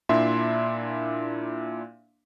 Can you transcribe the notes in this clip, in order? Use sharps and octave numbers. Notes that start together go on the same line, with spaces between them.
A#2 D4 E4 E5 C6